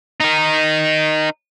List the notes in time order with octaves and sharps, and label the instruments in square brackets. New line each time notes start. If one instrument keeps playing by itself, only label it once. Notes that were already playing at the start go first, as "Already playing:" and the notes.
[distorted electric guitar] D#4 A#4